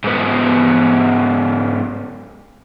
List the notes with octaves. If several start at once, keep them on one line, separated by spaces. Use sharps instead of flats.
G#2 B3